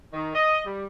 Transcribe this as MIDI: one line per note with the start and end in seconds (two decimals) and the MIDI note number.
0.13 0.30 51
0.35 0.60 75
0.66 0.86 55